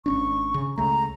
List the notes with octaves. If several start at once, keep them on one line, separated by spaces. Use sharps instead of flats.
G#1 C#4 D4 C#6
C#3
C#2 C#3 A3 A#5